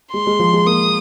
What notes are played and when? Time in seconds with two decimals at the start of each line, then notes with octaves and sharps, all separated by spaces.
0.13 G#3 C6
0.27 G#3
0.39 F3
0.53 G#3
0.66 A#3 D#6